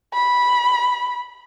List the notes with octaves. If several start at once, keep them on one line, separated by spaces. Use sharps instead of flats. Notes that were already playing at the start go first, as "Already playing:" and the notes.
B5